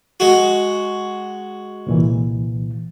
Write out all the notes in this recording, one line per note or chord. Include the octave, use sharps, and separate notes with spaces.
G#3 F#4
C2 A#2 E3